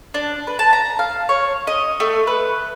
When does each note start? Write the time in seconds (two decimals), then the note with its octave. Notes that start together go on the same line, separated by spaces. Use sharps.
0.14 D4
0.47 B4
0.59 A5
0.73 A#5
0.99 F5
1.29 C#5
1.67 D#5
2.00 A3
2.27 B4